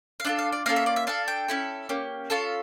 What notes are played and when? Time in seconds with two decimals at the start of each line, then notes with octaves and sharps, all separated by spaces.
0.20 F5
0.25 D4 F4 A4 E5
0.39 F5
0.52 D5
0.66 A#3 C#4 F4 A4 F5
0.76 E5
0.86 D5
0.96 E5
1.07 D4 A4 F5
1.28 G5
1.48 C#4 E4 A4
1.89 A#3 C#4 G4
2.30 C#4 F4 A4 A5